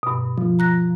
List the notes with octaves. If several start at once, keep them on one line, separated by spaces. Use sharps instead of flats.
G2 B2
F3
A#5 F#6 A#6